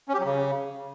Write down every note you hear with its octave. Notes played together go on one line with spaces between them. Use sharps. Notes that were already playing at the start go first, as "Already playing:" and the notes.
C#4
G4
F#3
C#3